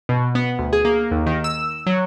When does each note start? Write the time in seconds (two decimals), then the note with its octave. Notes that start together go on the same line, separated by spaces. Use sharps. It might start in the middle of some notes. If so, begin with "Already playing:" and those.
0.09 B2
0.35 B3
0.59 D2
0.73 G#4
0.85 A#3
1.11 D#2
1.26 D#3
1.44 E6
1.87 F#3